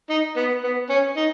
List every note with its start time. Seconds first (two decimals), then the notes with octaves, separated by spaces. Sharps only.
0.10 D#4
0.36 B3
0.64 B3
0.89 C#4
1.17 D#4